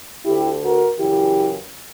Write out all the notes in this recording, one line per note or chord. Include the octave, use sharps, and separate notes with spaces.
D2 D3 E4 G4
F#4 A#4
F#2 C#3 E3 E4 G4